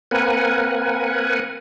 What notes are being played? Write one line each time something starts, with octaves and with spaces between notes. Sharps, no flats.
A#3 C4 A#4 B4 F#5 G#5